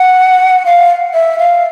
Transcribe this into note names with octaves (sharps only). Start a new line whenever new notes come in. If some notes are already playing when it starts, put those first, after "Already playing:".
Already playing: F#5
F5
E5
F5